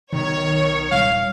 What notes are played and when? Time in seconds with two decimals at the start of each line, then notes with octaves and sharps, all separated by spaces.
0.13 B1 D#3 C#5
0.92 D#1 G3 F5